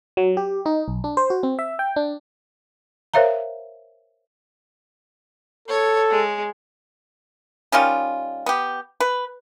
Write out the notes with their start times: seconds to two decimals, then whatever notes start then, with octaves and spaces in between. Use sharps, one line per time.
0.17 F#3
0.37 G4
0.66 D#4
0.88 B1
1.04 D4
1.17 C5
1.30 F#4
1.43 C4
1.59 E5
1.79 G5
1.96 D4
3.14 A#4 C5 C#5 E5 F5 A#5
5.68 A4 C#5
6.10 G#3
7.72 D#3 G3 C#4 F4
8.46 B3 G4
9.00 B4